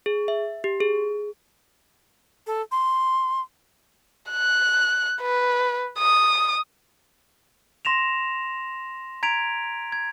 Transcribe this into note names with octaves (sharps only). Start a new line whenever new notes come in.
G#4
E5
G4
G#4
A4
C6
F#6
B4
D#6
C6 A#6 E7 F7
A#5 G#6 B6 D7 F7
G#6